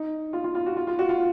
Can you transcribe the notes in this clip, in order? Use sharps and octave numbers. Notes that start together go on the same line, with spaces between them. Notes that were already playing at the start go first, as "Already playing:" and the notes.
Already playing: D#4
F4
F4
F4
F#4
F4
F4
F#4
F4